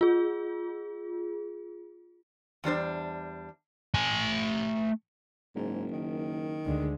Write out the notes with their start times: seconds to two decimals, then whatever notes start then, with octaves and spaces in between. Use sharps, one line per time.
0.01 F4 G#4
2.64 E2 G3 D4 C5
3.94 A3 G#5
5.56 F#1 G#2
5.91 D#3
6.65 D2 D3 G#3